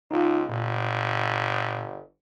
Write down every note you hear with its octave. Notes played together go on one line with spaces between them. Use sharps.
C#2 D#4 F4
G1 A#2